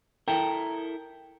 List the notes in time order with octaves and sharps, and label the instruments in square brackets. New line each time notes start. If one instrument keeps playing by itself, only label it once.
[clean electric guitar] E4 A4 A#4 [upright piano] G5